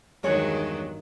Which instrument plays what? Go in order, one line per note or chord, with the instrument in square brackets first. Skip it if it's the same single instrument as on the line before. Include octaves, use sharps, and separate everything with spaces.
[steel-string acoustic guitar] E2 G#3 C#5 [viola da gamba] G2 D#3 F#3